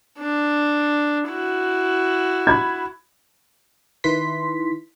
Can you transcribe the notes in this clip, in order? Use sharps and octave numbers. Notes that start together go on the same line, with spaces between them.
D4
E4 F#4
B5 G#6
D#3 E4 B4 C6 B6